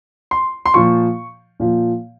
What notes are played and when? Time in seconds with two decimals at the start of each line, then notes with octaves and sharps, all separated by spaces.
0.31 C6
0.66 C6
0.74 A#2 F3 C#6
1.60 A#2 F3